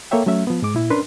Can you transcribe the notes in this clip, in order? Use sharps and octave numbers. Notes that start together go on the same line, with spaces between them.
A#3 A4 C#5 E5 G5
F#3 A3 C#4 E5
F3 B3
G#2 G#3 D6
A#2 E4
C#4 D4 A#4 B4 C6